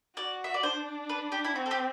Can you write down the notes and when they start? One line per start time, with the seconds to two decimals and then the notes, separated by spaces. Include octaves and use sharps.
0.17 F#4 D5
0.44 E5
0.54 D5
0.63 D4 C5
1.09 B4
1.32 G4
1.44 E4
1.56 C4 F#4
1.66 A4
1.71 G4